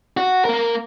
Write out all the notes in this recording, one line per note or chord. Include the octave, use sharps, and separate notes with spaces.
F#4
A#3 A#4